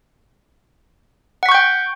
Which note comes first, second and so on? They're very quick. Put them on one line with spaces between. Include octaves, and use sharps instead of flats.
F#5 B6 C#6 G6 G5